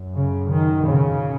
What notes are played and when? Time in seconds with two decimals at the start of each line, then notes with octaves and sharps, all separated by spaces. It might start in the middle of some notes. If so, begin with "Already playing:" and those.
Already playing: F#2
0.14 C#3
0.50 D#3
0.85 C#3